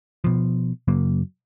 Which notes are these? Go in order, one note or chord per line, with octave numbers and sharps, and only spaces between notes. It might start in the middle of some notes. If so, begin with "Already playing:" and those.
B2 F3
F#2 C#3 F#3 A#3